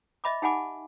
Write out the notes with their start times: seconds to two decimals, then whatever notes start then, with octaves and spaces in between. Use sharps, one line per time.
0.24 D#5 E5 B5 D6
0.42 D#4 G4 F#5 G#5 B5 D6